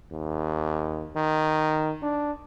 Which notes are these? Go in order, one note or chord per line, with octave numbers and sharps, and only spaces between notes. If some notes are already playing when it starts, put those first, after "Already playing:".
D#2
D#3
D4